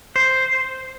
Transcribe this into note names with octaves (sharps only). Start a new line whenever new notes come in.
C5